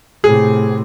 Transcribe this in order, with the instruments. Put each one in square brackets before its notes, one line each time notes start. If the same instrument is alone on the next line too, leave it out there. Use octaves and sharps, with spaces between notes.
[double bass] A2 C3 [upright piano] G#4